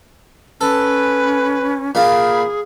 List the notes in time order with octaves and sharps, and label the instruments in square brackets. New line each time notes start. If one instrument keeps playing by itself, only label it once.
[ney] C#4 [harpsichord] A4 [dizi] B4
[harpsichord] A#2 F4 [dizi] G#4 [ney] B5